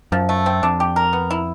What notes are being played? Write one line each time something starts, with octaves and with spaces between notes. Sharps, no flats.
F#2 F3
A3
C4
F2 D4
G4
A#4
B3
E4